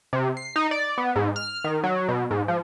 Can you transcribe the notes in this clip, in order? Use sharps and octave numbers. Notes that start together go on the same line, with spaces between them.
C3
C7
D#4
D5
B3
G#2
F6
D#3
F#3
B2
G#2
F3